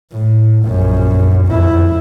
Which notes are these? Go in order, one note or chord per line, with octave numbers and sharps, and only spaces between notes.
A2
A#1 F#2
F2 E4